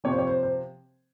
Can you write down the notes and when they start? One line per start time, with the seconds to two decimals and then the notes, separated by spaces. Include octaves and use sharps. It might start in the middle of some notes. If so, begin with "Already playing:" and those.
0.04 C3 F3 C#5
0.12 C5
0.18 C#5
0.27 C5
0.43 C5